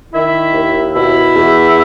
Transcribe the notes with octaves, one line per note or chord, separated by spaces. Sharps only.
D#3 E4 E5
D#2
B2 E4 E5
E2